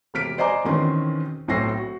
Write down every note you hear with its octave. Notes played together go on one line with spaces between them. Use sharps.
E1 C3 F6 B6 D7
C5 D5 D#5 G#5 A#5 D6
E2 B2 D#3 C4 C#4 C6
B1 A2 C4 A#6 C7
F#4